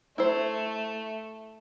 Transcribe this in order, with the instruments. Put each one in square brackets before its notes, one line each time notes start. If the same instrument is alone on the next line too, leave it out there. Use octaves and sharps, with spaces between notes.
[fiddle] A3 [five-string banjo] E4 C5